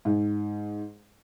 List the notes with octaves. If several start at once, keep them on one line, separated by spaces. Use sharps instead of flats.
G#2